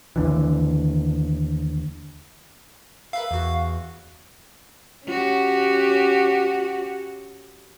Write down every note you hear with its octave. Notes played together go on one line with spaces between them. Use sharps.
D#2 D3 E3
A#4 B4 E5 F5
E2 F#4
C#4 F#4 G4